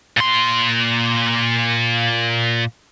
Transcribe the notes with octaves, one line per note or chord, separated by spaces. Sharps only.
A#2 C6